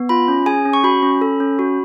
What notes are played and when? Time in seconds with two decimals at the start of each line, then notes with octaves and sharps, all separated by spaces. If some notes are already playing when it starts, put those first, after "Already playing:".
Already playing: B3
0.09 F4 B5
0.28 C#4
0.46 G#4 G#5
0.65 C#4
0.73 C#6
0.84 F#4 B5
1.02 C#4
1.21 A4
1.40 C#4
1.59 F#4